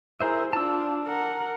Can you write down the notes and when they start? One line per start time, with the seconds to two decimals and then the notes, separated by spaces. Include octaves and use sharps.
0.21 E4 G#4 A#4 C5 E5
0.53 D4 F4 A5 E6
1.05 A#4 F#5